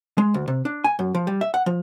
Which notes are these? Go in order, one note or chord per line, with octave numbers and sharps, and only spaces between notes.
G#3
D2
C3
D4
G#5
F#2
F3
G3
E5
F#5
F3